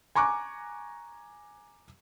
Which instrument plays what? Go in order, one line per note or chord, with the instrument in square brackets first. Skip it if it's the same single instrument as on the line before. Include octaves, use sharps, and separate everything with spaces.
[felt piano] G#5 A#5 C#6 D6 F#6